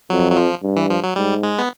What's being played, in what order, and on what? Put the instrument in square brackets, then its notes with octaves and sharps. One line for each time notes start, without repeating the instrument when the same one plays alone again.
[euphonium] F2 [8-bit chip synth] F#3
[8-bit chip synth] F#3
F3
[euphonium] G2
[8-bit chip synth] E3
F3
F#3
[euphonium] G#2 [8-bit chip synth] G3
[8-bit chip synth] G#3
B3